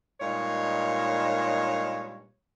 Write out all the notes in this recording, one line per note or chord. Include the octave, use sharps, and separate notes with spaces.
G2 A#2 G#3 D#4 C#5